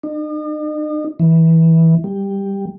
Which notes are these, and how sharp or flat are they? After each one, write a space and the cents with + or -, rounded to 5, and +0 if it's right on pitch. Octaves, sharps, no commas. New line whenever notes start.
D#4 -45
E3 -15
G3 +10